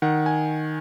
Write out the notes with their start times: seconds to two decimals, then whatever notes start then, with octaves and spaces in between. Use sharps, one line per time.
0.02 D#3 F#5
0.26 G#5